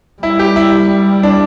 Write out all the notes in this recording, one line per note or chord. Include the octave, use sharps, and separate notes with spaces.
G3 E4
G4
E4
D4